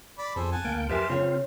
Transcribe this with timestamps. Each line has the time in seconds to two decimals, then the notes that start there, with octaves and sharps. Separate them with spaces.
0.18 D5 B5
0.36 F2 G#4 A4 C5
0.52 F#5 G#5 A5
0.64 D2 A#3 G5
0.89 G4 A#4 B4 E5 G#5 A5 C6
1.09 C#3 C4 F4 C#5